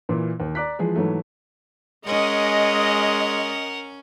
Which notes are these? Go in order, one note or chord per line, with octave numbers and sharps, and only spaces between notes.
A#2 E3
D#2
D5 A#5 D6 F#6 B6
E3 F3 G#3 G#4
G#2 E3 F#3 A3
G#3 C#4 A#4 D#5 F#5